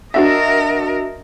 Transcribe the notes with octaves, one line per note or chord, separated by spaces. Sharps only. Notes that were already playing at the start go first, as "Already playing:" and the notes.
D4 F#4 A#4 D#5 E5